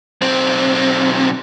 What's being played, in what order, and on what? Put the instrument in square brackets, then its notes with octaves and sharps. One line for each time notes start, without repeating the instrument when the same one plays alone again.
[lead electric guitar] B1 C4